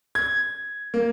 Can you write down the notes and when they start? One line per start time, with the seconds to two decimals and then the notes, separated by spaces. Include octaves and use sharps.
0.15 G#6
0.94 A#3